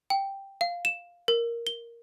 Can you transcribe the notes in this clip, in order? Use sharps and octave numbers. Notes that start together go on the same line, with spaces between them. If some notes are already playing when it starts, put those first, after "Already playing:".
G5
F5
E7
A#4
G7